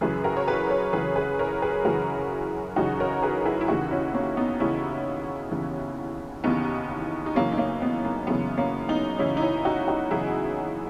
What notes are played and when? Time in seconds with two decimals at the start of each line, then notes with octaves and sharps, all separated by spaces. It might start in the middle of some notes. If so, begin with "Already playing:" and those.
0.01 F#2 C#3 E3 G#4 B4
0.24 F#4 A#4
0.37 C#5
0.47 G#4 B4
0.70 A#4 C#5
0.93 F#2 C#3 E3 G#4 B4
1.16 G#4 B4
1.39 A#4 C#5
1.62 G#4 B4
1.85 F#2 C#3 E3 F#4 A#4
2.76 F#2 C#3 E3 D#4 F#4
3.00 A#4 C#5
3.23 G#4 B4
3.45 E4 G#4
3.61 E4
3.68 D#2 C#3 E3 D#4 F#4
3.91 C#4 E4
4.14 A#3 C#4
4.37 B3 D#4
4.60 D#2 C#3 E3 C#4 E4
5.51 D#2 C#3 E3
6.44 D#2 C#3 E3 B3 D#4
7.26 D#4
7.35 F#2 C#3 E3 A#3 C#4
7.52 D#4
7.58 A#3 C#4
7.82 B3
8.05 A#3
8.27 F#2 C#3 E3 B3
8.58 A#3 C#4
8.89 B3 D#4
9.19 F#2 C#3 E3 C#4 E4
9.37 D#4
9.42 C#4 E4
9.65 D#4 F#4
9.88 D#4 F#4
10.11 F#2 C#3 E3 E4 G#4